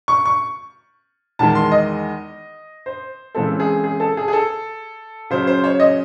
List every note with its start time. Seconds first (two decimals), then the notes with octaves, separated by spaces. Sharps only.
0.08 C#6
0.26 C#6
1.39 E2 D#3 G#3 A5
1.55 C6
1.72 D#5
2.86 C5
3.35 C#3 E3 G#3 C4 A4
3.60 G#4
3.84 G#4
4.00 A4
4.17 G#4
4.28 G#4
4.33 A4
5.30 C#3 F#3 C#4 C5
5.47 C5
5.64 C#5
5.80 D#5